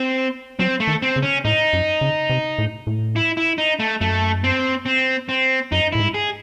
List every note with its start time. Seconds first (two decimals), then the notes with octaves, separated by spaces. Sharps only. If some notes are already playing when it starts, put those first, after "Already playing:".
Already playing: C4
0.59 F#3 C4
0.80 A3
0.87 D#3
1.02 C4
1.16 C#3
1.23 C#4
1.45 A2 D#4
1.73 F#2
2.01 C#3
2.30 C3
2.58 A2
2.87 A2
3.16 E4
3.37 E4
3.58 D#4
3.80 A3
4.01 F#2 A3
4.44 C4
4.86 C4
5.29 C4
5.72 F#2 D#4
5.92 A2 E4
6.00 G#2
6.14 G#4